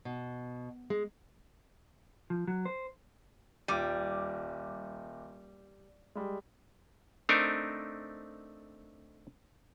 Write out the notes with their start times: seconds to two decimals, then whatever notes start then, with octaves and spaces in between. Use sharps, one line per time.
0.05 B2
0.90 G#3
2.30 F3
2.47 F#3
2.65 C5
3.68 D#1 G3 D6 D#7
6.15 G3 G#3
7.29 A3 C4 D4 D#4 A#4